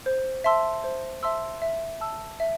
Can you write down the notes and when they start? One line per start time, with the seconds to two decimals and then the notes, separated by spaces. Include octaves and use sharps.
0.06 C5
0.44 E5 A5 C6 E6
0.84 C5
1.23 E5 A5 C6 E6
1.62 E5
2.01 A5 E6
2.40 E5